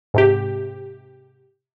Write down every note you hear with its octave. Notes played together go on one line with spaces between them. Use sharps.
G#2 C3 G4